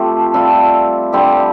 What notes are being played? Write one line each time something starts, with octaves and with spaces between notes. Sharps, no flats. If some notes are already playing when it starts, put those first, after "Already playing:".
Already playing: F3 A3 C4 G4
G3 C4 F4 A4
D3 G3 C4 G4